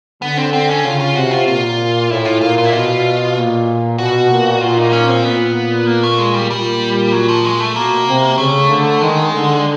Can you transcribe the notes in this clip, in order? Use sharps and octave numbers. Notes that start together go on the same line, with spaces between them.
D3 B3
C4
C4
C#4
C#3 F4
F4
C3 F#4
F4
A#2 F4
A2 E4
F4
A#2 F4
F4
E4
B2 F4
A#2
B2 F#4
A#2
A#2 F4
D#4
C#4
C4
A#2 B3
A#3
A3
G#3
G3
A#2 G3
F#3
F3
G#3
A3
B2 A#3
C3
C#3 A3
D3
D#3 G#3
D3